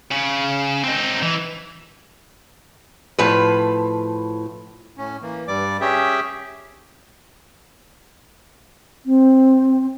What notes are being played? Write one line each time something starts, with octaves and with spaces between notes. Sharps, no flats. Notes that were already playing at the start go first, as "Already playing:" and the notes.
C#3
C4 D#4
E3
A2 F3 B4
A2 C#4
E3 A#3
G2 G3 D5 D6
C#4 G4 G#4 E5 G5
C4